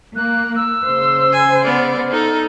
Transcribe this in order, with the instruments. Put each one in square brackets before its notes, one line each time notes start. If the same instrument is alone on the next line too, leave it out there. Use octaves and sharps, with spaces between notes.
[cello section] A#3 [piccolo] F#6
[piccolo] E6
[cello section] C#3 C5
[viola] G#5
[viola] B3 D5 [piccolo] F6
[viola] D#4 A4